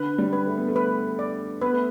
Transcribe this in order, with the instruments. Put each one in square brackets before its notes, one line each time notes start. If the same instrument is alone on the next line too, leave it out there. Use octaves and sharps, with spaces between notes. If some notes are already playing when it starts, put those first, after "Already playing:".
Already playing: [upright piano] D3 [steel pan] B4
[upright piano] G3
[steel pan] B4
[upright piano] A3
B3
A3
[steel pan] B4
D5
[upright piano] B3 [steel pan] B4
[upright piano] A3